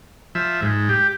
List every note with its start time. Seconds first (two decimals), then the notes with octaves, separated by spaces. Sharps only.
0.35 F3 E5
0.62 G#2
0.89 G4